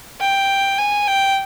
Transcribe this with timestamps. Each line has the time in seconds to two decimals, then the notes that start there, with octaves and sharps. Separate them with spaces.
0.21 G5
0.78 G#5
1.08 G5